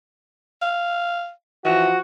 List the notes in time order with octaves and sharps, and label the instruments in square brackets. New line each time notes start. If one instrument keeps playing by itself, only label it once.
[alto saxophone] F5
[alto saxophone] E3 [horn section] F3 F#4